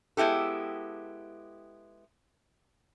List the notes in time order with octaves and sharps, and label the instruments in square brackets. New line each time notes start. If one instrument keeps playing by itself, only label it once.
[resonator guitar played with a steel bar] G#3 B3 E4 G4 A4